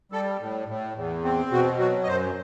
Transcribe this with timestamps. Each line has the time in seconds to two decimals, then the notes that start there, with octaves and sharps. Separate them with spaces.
0.12 G3 A4
0.40 A2
0.68 A2
0.95 E2
1.24 C4
1.51 B2 F#4
1.79 F#3 F#4
2.03 D#5
2.07 F#2 C5